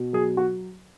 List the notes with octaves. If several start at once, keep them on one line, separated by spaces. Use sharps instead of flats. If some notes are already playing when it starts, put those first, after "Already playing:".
Already playing: B2
F#3 G#4
F#4